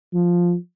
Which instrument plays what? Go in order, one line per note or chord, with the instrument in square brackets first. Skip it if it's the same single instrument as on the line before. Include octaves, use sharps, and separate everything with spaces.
[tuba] F3